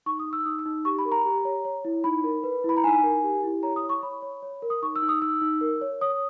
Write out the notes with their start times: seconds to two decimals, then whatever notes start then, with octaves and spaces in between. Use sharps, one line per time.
0.06 D#4 C#6
0.19 D#6
0.26 D#4
0.33 E6
0.45 D#4 D#6
0.59 E6
0.66 D#4
0.85 G4 C#6
0.99 B5
1.05 A#4
1.12 A#5
1.25 G4
1.45 C#5
1.65 C#5
1.85 E4
2.04 D#4 B5
2.24 A#4
2.44 B4
2.64 E4 B5
2.77 A#5
2.84 D#4 G#5
3.03 A#4
3.23 G4
3.43 E4
3.63 C#5 A#5
3.76 D#6
3.83 C#5
3.89 C#6
4.03 C#5 B5
4.22 C#5
4.43 C#5
4.62 A#4
4.70 D#6
4.82 D#4 C#6
4.96 E6
5.02 D#4
5.09 D#6
5.22 D#4 E6
5.42 D#4
5.61 A#4
5.81 C#5
6.01 C#5 D#6